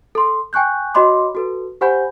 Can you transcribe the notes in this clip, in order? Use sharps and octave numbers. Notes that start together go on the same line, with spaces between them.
A4 C6
G5 G#5 C#6 F#6 G6
F#4 C#5 D#5 B5 C6 D6
F#4 A4 B4
G4 C5 F#5 G#5 B5 G6